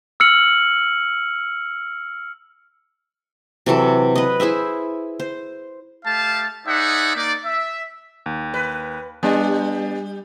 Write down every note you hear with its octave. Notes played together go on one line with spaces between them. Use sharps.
E6 F6 C#7 F#7
C3 E3 F#3 A4
B4 D#5
E4 G#4 C5 E5
C5
A3 G4 F5 A5
D#4 G#4 C5 D5 E5 F#5
A#3 D#4 D5
E5
D#2
B4
G3 B3 D4